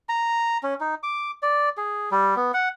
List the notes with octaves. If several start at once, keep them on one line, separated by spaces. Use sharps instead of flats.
A#5
C#4
D#4
D6
D5
G#4
G3
B3
F#5